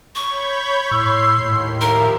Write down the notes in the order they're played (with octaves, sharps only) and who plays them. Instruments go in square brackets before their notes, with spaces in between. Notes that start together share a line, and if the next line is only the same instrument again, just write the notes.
[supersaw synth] C#5 B5 G6 [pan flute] C#6
[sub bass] A2 [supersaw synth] C6 C7 [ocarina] E6
[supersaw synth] D#2 [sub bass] A2
[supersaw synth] F3 G4 E5 [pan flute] A#4 [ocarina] A#5